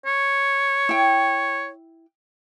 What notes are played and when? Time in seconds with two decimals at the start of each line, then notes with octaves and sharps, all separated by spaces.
0.06 C#5
0.89 E4 G5